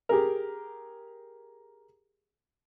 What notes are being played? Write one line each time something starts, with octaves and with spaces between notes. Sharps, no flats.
G4 G#4 A#4